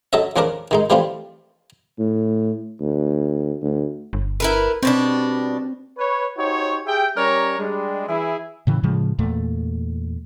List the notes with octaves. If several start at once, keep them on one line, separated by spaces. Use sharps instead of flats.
F#3 A4 C#5 D#5 E5
E2 F3 C#4 D4 A#4 D6
D#3 G#3 D#4
E3 F3 G3 A3 C4 F4
A2
D2
D2
G1
E4 A#4 B4
B2 G3 C4 D4
B4 C#5
D#4 F#4 G4 C5 C#5
G4 G#4 E5 G5
G3 C#4 A#4 C#5 D5 A#5
G3 G#3 D4
E3 E4 G#4
A2 C#3 E3
A2 C#3 F3 G#3
E2 A#2 A3